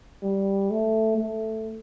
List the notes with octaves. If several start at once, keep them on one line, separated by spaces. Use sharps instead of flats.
G3
A3
A3